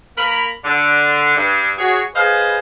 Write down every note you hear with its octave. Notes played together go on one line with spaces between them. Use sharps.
A#3 A#4 B5
D3
G2
F#4 G#4 C#5
G#4 B4 C5 D#5 F5